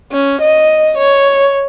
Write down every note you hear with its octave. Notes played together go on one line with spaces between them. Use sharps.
C#4
D#5
C#5